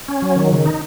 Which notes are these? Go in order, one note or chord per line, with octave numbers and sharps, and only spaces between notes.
C#4
F#3
D#3
C#3
D#4